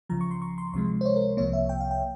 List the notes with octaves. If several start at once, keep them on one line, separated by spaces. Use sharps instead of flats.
C#2 C#3 F3 A#5
C#6
C6
C#6
C6
C#2 C3 F3 G#3 C6
C5
C#5
A#4
C2 C3 F3 A#3 C#5
E5
G5
F5
G5